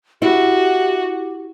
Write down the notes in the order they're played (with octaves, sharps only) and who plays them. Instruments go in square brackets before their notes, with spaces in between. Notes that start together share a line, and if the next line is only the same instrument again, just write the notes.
[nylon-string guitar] E4 [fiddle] F#4 [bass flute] G4